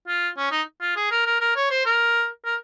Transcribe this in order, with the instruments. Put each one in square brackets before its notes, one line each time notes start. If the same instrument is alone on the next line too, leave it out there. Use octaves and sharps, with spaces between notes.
[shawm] F4
C#4
D#4
F4
G#4
A#4
A#4
A#4
C#5
C5
A#4
A#4